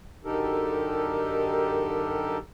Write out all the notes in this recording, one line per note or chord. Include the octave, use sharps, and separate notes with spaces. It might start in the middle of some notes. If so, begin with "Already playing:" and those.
F#2 D3 D#4 G4 A4 A#4